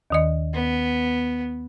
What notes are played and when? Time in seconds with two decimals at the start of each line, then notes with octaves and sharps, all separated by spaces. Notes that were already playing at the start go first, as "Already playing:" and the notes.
0.10 D#2 D#3 D#5
0.54 B3